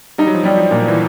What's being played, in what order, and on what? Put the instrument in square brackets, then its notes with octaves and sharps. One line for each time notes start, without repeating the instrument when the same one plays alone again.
[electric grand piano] G3 [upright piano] D#4
[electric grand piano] F#3
F3
[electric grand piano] F#3 [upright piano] G3
[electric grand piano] F3
[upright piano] A#2
[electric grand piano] E3